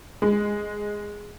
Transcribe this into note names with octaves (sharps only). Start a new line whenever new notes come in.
G#3